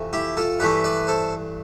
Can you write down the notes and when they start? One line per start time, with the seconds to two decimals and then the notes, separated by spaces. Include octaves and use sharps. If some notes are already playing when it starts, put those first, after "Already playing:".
Already playing: F2 C3 E3 A3
0.13 E4 G4
0.37 F4 A4
0.60 G2 E3 A3 G4 B4
0.84 B4 D5
1.07 A4 C5